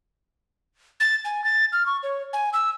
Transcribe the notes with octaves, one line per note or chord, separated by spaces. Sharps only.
A6
G#5
A6
F6
C#6
C#5
G#5
E6